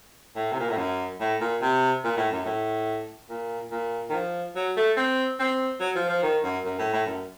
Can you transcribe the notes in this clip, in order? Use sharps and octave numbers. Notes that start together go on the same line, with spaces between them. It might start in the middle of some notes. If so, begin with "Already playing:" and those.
A2
C3
A#2
A2
F#2
A2
A#2
C3
A#2
A2
F#2
A2
A#2
A#2
D#3
F3
F#3
A3
C4
C4
F#3
F3
F3
D#3
F#2
F#2
A2
A2
F#2